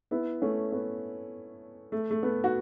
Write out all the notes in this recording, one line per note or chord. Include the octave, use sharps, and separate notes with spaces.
B3 E4
A3 C#4
B3
A3
A3
B3
F#4